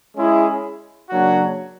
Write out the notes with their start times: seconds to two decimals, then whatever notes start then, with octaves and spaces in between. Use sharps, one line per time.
0.16 G#3 C#4 E4 G#4
1.10 C#3 F#3 A#3 D4 F#4